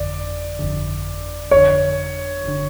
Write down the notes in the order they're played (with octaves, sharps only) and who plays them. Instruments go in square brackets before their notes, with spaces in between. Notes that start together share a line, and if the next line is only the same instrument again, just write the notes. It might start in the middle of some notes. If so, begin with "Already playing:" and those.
Already playing: [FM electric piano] G1 F2 D3 [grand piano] D5
[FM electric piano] G1 F2 D3
[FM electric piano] G1 F2 D3 [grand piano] C#5
[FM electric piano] G1 D3